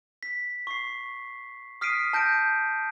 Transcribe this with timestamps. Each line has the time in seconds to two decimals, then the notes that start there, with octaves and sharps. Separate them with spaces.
0.23 B6
0.67 C#6 C7
1.81 D#6 F6 B6 C7 D7 D#7
2.13 A5 G6 A#6 D7